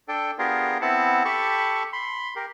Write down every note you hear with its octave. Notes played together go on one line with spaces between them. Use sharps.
D4 A4 G5
B3 D4 F4 G4 G#4 A#4
B3 C4 E4 F#5 A5
G4 A4 A5 B5 C#6
B5 C6
G4 A#4